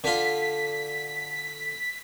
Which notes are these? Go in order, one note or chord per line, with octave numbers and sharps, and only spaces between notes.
D3 F4 B6